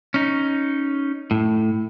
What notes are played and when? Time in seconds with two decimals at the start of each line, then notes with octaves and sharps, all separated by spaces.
0.14 C#4 D#4
1.31 A2